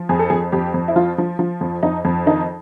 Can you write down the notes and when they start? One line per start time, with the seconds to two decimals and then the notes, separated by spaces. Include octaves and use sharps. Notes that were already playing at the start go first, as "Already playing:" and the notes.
Already playing: F3
0.09 F2 G#4
0.19 A4
0.30 F2 G#4
0.52 F2 G4
0.74 F2
0.88 E4
0.96 F3 F4
1.18 F3
1.39 F3
1.61 F2
1.83 F2 D#4
2.05 F2
2.26 D#3 D#4